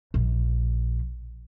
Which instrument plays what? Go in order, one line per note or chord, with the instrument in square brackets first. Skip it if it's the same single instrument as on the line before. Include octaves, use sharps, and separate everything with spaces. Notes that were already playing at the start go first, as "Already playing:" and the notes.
[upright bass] A#1